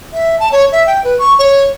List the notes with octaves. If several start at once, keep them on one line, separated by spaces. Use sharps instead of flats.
E5
A5
C#5
E5
G5
B4
C#6
C#5